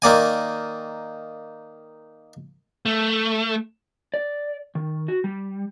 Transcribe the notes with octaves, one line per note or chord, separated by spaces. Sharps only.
D#3 A#3 D5 G#5
A3
D5
D#3
F#4
G3